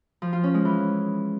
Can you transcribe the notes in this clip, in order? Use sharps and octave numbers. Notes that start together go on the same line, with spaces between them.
F3
F4
C#4
G#3
E3